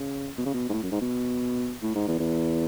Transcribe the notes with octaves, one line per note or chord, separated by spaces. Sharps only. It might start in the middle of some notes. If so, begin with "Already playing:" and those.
Already playing: C#3
B2
C#3
B2
G#2
A2
F#2
G#2
B2
A2
G#2
E2
E2